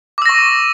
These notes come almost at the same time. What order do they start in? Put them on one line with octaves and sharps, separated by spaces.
D6 E6 A#6 C#6